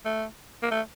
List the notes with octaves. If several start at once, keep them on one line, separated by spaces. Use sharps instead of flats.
A3
A#3
A3